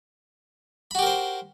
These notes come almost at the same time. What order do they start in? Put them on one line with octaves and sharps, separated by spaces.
B5 F#4 G4 A#4 C5